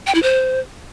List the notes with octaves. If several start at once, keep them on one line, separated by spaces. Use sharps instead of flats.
G5
E4
C5